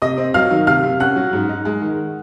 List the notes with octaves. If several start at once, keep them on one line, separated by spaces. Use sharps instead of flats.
C3 D#5 D#6
C4
F#3 F5 F6
D#3
C3 F5 F6
C3
C#4 F#5 F#6
F#3
G#2
D#4
G#3
D#3